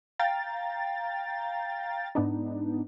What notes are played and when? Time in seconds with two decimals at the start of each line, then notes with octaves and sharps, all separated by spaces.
0.19 F5 G5 A#5 A6
2.15 G#2 B3 D4 D#4